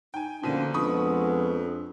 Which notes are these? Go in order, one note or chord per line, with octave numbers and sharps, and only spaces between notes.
D#4 G5 G#5
B2 D3 F3 A#3 C#4 D#7
F2 F3 G#3 B3 D4 B5 C#6 D#6